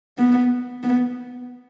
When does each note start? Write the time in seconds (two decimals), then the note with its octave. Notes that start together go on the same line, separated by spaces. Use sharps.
0.18 B3
0.83 B3